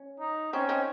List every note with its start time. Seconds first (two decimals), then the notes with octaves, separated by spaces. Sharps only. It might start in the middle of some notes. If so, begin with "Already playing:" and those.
Already playing: C#4
0.20 D#4
0.53 C4 C#4
0.69 C4 D#4